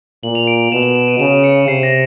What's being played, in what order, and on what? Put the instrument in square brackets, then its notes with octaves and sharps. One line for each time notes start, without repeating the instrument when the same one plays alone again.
[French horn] A#2 [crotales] F#7
[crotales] F7
D7
[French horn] B2 [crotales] E7
[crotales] F7
E7
D#7
[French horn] C#3 [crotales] E7
[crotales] C#7
[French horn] C3 [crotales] C7
[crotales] A#6